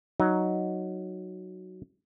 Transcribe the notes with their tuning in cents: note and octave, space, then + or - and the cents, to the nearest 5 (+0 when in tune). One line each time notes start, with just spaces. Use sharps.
F#3 +0 D#4 +0